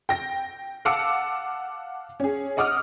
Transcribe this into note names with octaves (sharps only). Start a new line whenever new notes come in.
G5 A#6
F5 F#5 A5 D6 E6 C#7
C#4 G#4
D#5 F#5 D6 D#6 F6